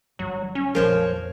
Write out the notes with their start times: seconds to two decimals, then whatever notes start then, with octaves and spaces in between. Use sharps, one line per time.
0.19 G1 F#3
0.55 C#4
0.75 A#1 F2 F3 A#4 C5 C#5